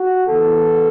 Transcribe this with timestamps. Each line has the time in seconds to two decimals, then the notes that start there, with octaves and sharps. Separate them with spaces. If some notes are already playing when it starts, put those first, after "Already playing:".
Already playing: F#4
0.28 E2 E3 B3 A4